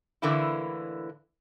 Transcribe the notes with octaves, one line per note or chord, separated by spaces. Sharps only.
A2 D3 E3 A#3 E4